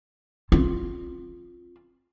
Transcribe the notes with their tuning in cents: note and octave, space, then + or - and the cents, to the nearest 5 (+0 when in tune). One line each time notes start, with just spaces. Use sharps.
C4 +25 F4 +0